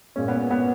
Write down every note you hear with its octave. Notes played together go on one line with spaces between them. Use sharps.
A#2 G#3 C#4
B3
B3